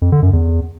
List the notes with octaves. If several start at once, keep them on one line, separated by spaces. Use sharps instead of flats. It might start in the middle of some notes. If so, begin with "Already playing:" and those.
F2
D3
F#2
E2